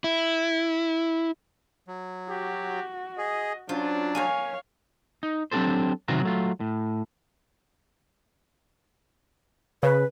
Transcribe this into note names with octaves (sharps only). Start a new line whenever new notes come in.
E4
F#3
F#4 G4
G#4 D#5
F#3 C#4 D4 F4 C5
A#3 C#4 C#5 F5 G#5
D#4
F#3 C4 D4 G4 A4 C5
C3 D#3 F#3 F4 F#4 A#4
F#3 A3 F4
A2
C#3 B4